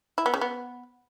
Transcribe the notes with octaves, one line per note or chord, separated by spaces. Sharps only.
E4
B3
C#3
B3